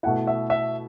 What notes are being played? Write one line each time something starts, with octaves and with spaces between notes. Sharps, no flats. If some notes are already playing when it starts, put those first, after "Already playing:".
B2 A3 E4 F#5
E5
E5